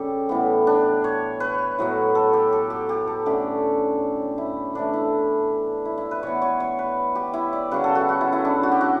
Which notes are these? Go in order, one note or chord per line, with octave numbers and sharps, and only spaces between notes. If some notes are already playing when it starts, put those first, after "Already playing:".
Already playing: C#3 G3 C#4 G4 A4
A2 E3 B3
D4
C#5
B4
A2 F#3 B3
A4
G4
A4
G4
G4
A4
D3 A3 C#4 G4
E4
A2 E3 A3 D4
E4
E4
E4
B4
E3 B3 C#5
C#5
C#5
B4
G4
E4
D5
C#3 F#3 C#4 B4
A4
F#4
F#4
E4
E4
D4
F#4
G4
F#4